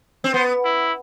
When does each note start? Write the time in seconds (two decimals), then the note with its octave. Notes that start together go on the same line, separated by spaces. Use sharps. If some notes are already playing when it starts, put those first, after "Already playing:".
0.24 C4
0.33 B3 C5
0.64 E4